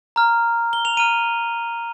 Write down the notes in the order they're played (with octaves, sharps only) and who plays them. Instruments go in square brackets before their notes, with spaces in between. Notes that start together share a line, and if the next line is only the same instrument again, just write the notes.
[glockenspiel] A#5 F6
G7
F7
A#5 F6 D#7